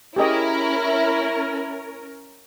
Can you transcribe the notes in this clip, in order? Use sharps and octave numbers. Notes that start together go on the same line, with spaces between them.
C#4 E4 G4 G#4 A#4 D#5